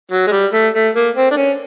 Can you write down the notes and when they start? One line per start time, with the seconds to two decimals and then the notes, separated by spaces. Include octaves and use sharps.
0.11 F#3
0.27 G#3
0.32 G3
0.52 A3
0.74 A3
0.94 A#3
1.16 C4
1.31 D4
1.37 C#4